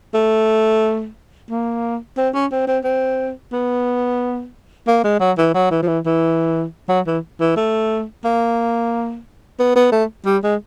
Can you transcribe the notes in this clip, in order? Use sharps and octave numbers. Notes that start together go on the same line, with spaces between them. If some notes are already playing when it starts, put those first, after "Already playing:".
A3
A#3
C4
C#4
C4
C4
C4
B3
A#3
G#3
F#3
E3
F#3
E3
F3
E3
E3
F#3
E3
E3
A3
A#3
B3
B3
A3
G3
G#3